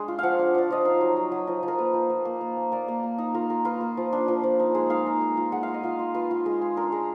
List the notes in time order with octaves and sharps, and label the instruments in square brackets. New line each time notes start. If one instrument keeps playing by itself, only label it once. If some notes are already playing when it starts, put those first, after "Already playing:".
Already playing: [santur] G#3 D4
F4
F3 F5 F#5
D4
F3 D5
F3 D#5
D#4 F5
F#3
F#3
F#3
F3 D#5
F3
A#4
A#3 B4
F3
A#3
A#3
A#3
A#3
A#3 D5
A#3
A#3
D#4
F4 A#4
F4 A#4
F4 B4
A#3
F3
D4
F3
F3
D#4
G#3
D#4 F5
D#4
G#3
F4
G#3 F#5
F5
F4
D#5
F4 F5
F4
F4 B4
F4
G#3
G#3
D4 A#4
G#3